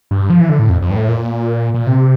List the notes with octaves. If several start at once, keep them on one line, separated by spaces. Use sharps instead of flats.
G2
F3
E3
D3
A2
F2
F2
G2
A2
A#2
A#2
C3